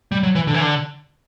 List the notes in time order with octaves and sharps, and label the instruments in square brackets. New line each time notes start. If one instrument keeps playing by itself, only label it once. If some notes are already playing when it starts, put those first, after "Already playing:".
[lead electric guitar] G3
F#3
E3
D3
E3
D3